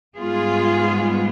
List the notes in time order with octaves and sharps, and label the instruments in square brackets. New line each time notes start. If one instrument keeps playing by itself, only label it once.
[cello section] G#2 G3 B3 F4 G#4